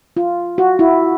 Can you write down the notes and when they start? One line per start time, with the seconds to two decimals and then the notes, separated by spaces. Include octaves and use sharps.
0.17 F4
0.58 F#4
0.79 E4